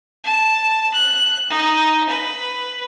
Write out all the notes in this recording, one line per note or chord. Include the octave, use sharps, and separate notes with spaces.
A5
F#6
D#4
B4